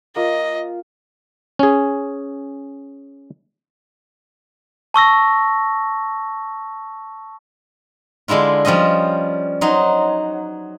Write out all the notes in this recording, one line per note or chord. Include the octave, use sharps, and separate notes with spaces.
A#3 F4 D#5
C#4 G#4
A5 C#6 E6 A#6
D3 G#3 D4 E4 F4
F3 G3 C#4 C5 D#5
F#3 D#4 C5